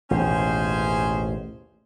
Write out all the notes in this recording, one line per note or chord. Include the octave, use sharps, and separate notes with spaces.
A1 D#2 B2 C#4 G#4 C5